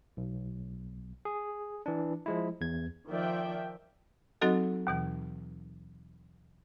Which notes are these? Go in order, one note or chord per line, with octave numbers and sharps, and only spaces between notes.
B1
G#4
E3 D4
F3 G#3 E4
E2 G#6
D#3 F3 D5 E5 G5
F#3 C4 D#4 F#4 A4 D#5
D#2 B2 E3